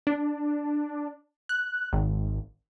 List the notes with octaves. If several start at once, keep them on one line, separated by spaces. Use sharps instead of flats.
D4
F#6
G#1